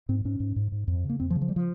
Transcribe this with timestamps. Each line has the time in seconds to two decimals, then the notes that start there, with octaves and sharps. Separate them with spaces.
0.09 G#2 C4
0.25 G#2 C#4
0.40 G#2
0.56 G#2
0.72 G#2
0.88 F2
1.04 C#3
1.10 A#3
1.20 F2 C4
1.30 F3
1.35 C#3
1.41 F3
1.49 G3
1.56 F3